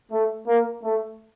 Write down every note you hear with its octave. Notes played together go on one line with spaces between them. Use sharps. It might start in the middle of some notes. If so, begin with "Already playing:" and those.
A3
A#3
A3